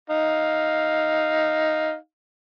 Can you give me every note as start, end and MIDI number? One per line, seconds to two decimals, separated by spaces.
0.10 1.95 63
0.10 1.95 77